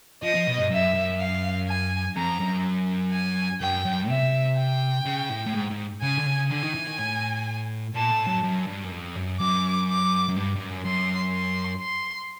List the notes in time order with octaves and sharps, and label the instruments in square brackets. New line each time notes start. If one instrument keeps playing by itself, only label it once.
[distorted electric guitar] F3 [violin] D#5
[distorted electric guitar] F3
B2
G2
[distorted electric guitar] F#2 [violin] E5
[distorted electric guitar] F#2
[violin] F5
G#5
[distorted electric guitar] F2 [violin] A#5
[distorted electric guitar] F#2
[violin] G#5
[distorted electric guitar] F#2 [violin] G5
[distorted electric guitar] F#2
[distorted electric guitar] C3 [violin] E5
[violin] G5
[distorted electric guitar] C#3
A2
A2
G#2
G#2
[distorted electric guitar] C#3 [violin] G#5
[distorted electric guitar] D3
C#3
[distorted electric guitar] D3 [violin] G#5
[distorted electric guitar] D#3
E3
D#3
A2
[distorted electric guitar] A#2 [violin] A5
[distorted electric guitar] A2
F#2
F#2
G2
F#2
F2
F#2
[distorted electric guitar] F#2 [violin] D6
[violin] D6
[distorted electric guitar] F#2
G2
G2
F#2
[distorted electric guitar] F#2 [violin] C6
[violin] C6
C6